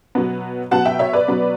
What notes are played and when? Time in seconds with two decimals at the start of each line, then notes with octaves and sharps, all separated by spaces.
0.15 B2 F#3 B3
0.71 B2 F#3 B3 F#5 A5
0.85 E5 G5
0.99 C#5 E5
1.13 B4 D5
1.28 B2 F#3 B3